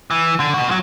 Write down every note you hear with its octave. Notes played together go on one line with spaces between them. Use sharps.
E3
D3
B2 F#4
F3 F#3